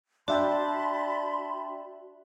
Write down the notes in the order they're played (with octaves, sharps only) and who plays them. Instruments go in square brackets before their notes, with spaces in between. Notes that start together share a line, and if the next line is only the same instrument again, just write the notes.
[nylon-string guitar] D4 [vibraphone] F#4 [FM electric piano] D5 E5 G5 [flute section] A5 B5 C6